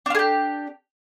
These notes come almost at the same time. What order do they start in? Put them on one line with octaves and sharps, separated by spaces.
D4 F4 G#4 G4